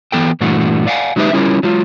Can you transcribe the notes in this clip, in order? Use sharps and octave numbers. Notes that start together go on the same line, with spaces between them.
E3 B3 A4 G5
G2 A#2 E3 A3 D4 F#4
D5 F5 F#5 G#5
F#3 G#3 D#4 G4 B4 E5
G3 C#4 E4 F4 A#4 C#5
F#3 G#3 F4